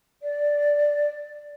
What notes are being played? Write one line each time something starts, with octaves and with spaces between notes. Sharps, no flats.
D5